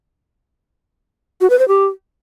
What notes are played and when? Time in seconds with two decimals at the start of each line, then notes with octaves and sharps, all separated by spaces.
1.41 F#4
1.50 B4
1.59 C5
1.68 G4